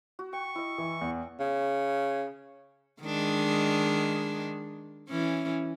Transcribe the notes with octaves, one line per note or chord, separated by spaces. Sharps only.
F#4
G5 C#6
E4 D#5
E3
E2
C#3
D#3 G#3 D4
E3 C#4